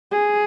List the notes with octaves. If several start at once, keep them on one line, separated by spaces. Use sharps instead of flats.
G#4